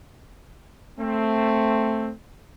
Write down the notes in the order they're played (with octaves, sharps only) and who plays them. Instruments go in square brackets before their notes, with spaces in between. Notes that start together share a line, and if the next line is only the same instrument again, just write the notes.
[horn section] A3 C4